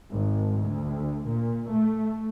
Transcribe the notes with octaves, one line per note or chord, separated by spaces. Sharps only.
G#1
D2
A#2
A3